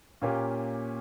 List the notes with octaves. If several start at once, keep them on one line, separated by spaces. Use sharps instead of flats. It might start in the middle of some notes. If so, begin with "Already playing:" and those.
A#2 A#3 C#4 G4